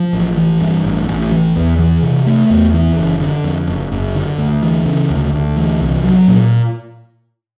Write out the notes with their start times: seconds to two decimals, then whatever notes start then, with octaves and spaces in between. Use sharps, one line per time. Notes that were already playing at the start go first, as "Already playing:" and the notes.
Already playing: F3
0.13 A1
0.37 E3
0.61 G2
0.85 A1
1.08 A1
1.32 E3
1.56 E2
1.79 E3
2.03 C3
2.26 A3
2.50 E2
2.73 E3
2.97 F#1
3.21 D3
3.44 F2
3.68 F#1
3.92 F#1
4.15 D3
4.38 D2
4.62 E3
4.86 C#3
5.10 D2
5.33 D2
5.57 E3
5.80 C2
6.04 F#3
6.28 A#2